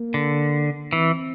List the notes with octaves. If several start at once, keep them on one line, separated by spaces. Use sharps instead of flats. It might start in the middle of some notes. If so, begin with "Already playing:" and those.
Already playing: A#3
D3
E3 C4